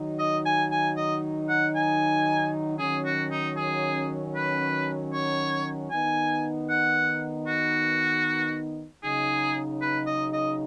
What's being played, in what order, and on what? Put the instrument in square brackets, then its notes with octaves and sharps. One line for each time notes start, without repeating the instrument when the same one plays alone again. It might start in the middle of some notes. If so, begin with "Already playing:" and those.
Already playing: [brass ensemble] D#3 F#3 D#4
[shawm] D#5
G#5
G#5
D#5
F#5
G#5
[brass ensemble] D#3 F#3 C#4 [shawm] G#4
[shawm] F#4
D#4
G#4
B4
C#5
[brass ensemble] D#3 B3 D#4 [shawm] G#5
[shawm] F#5
F#4
[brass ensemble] C#3 F#3 D#4 [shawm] G#4
[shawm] B4
D#5
D#5